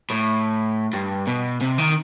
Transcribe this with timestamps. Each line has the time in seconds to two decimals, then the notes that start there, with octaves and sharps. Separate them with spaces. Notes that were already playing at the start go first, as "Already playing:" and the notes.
0.10 A2
0.93 G2
1.27 B2
1.61 C3
1.78 D#3